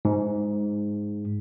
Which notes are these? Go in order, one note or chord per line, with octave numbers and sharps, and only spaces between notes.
G#2